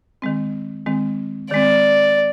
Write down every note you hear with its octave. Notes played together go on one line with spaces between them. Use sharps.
D#3 G#3 C4
D#3 G#3 C4
D#3 G#3 C4 D5